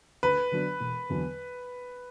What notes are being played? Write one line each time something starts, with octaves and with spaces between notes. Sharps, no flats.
D2 B4
D3 F#3 B3 D4
E1
E2 D3 F#3 B3